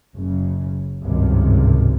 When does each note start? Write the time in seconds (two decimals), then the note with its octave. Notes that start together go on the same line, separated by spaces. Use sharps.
0.14 F#1 C#3
1.02 G#1 C#2 G2 C3 D#3